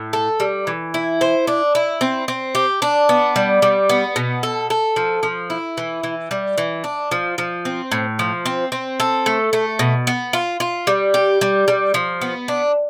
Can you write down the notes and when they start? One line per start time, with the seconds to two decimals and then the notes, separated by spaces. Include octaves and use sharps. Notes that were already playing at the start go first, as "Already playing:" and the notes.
Already playing: A2
0.13 A4
0.40 G3
0.67 E3
0.94 E4
1.21 C5
1.47 D4
1.75 E4
2.01 C4
2.28 C4
2.55 G4
2.82 D4
3.09 B3
3.36 G3
3.62 G3
3.89 B3
4.16 B2
4.43 A4
4.70 A4
4.96 F3
5.23 F3
5.50 E4
5.77 E3
6.03 E3
6.31 G3
6.58 E3
6.84 D4
7.11 F3
7.38 F3
7.65 C4
7.92 A2
8.19 F3
8.46 C4
8.72 C4
9.00 A4
9.26 A3
9.53 A3
9.79 B2
10.07 B3
10.33 F4
10.60 F4
10.87 G3
11.14 G4
11.41 G3
11.68 G3
11.94 F3
12.21 B3
12.48 D4